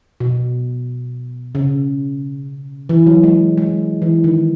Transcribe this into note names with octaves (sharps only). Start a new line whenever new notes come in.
B2
C#3
E3
F#3
G#3
G#3
E3
D#3